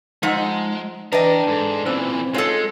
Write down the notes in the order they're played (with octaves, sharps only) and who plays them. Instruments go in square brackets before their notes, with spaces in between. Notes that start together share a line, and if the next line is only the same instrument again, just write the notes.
[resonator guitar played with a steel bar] F3 D#4 [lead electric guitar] G#3 [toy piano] D#5 F#5 E6
[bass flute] E3 [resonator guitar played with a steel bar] D4 D#5 [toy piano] B4 [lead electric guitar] G5 A#5
[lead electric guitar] G#2 [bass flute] A4
[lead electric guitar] A#2 E3 [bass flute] C4 [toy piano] C#4 C5 E6
[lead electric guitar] G#3 [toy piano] D#4 C#5 F5 [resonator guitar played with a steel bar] F4 A4